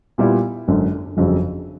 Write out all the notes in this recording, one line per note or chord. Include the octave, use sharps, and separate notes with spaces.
A#2 G3 B3 E4
G#1 F#2 D3
G1 F2 C#3 F#3